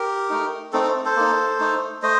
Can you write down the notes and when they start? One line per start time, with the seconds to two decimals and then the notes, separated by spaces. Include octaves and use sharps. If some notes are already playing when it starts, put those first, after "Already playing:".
Already playing: G4 A#4
0.30 A3 D#4
0.73 A3 C4 D#4 A4
0.83 A4
1.05 A4 C5
1.16 A#3 D#4
1.60 A3 D#4
2.02 A3 C5 D#5